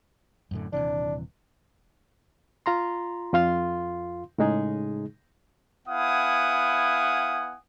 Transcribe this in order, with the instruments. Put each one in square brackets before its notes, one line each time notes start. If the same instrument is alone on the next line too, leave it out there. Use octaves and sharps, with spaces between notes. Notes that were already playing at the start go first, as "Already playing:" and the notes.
[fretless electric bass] F#2 A2 D3
[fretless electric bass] D#1 C3 E3 [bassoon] D4
[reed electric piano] F4 A#5 C6
F2 F4 F5 C6
A2 C#3 G#3 D#4 G#4
[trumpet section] B3 E4 F5 F#5 G#5 D#6